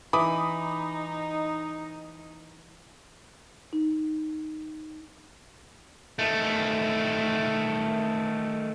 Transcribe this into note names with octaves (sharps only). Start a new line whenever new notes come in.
E3 D#4 B5 D6 D#6
D#4
D#3 A3